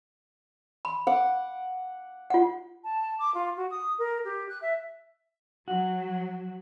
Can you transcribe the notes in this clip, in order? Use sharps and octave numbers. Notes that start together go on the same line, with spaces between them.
B5
F#5 D6
F4 F#5
A5
D6
F4
F#4
D#6
A#4
G4
F#6
E5
F#3 F#4